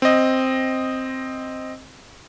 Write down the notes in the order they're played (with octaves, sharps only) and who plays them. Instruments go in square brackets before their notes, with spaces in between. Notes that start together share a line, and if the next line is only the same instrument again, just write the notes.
[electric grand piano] C4 D#5